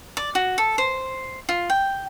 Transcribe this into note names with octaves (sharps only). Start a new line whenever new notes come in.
D5
F#4
A4
C5
F4
G5